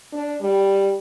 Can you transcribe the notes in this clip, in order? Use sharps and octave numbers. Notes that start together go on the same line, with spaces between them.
D4
G3